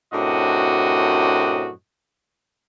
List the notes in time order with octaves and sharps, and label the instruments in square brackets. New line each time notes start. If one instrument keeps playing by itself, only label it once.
[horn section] F#2 A2 C3 D4 F#4 D#5